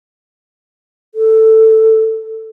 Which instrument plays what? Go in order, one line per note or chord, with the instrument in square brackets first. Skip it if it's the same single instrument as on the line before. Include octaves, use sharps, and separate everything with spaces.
[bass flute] A4